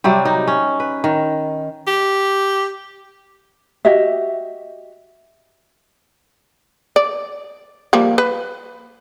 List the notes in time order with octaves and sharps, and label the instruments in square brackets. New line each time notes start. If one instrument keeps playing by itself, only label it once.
[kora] C3 F#3 G3 C4
C4 D#4
C#4
B4
D#3
[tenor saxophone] G4
[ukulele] F#4 G4 D#5 E5
[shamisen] D5
F3 G3 A#3
B4